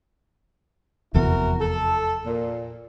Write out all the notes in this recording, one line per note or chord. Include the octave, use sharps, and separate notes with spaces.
F1 E2 E4 F#4 A#4
A4
A#2